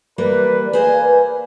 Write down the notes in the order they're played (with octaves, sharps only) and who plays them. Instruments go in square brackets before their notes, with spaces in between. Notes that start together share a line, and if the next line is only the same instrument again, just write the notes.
[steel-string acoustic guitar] E3 G3 A#3 [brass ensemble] B4 [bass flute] D5
[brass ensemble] A#3 G#5 [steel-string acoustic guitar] G#4 C5 D#5 [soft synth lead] B4